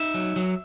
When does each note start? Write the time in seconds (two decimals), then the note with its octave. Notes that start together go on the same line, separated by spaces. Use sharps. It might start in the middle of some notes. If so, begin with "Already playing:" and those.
Already playing: D#4 E5
0.14 F#3
0.36 F#3